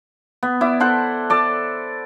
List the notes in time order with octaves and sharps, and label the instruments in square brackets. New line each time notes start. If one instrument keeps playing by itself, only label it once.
[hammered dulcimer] B3
E4 D5
A4 C5 F#5
A4 D5